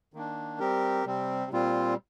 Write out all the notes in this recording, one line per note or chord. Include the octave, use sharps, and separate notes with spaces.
D#3 A#3 D4
G3 C4 G4 A#4
C3 G3 C4
A#2 G3 C4 F4